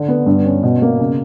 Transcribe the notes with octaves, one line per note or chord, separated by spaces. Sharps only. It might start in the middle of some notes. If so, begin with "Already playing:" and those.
Already playing: D3
B3
G2
C#4
B2
A#3
C#3